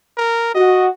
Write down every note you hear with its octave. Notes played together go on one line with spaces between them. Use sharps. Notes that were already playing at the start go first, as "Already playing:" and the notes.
A#4
F#4 D#5